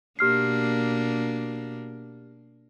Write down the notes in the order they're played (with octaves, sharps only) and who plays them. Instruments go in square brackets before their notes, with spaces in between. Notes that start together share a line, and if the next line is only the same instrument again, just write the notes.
[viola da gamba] B2 A#3 D4 [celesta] G4 F6 C7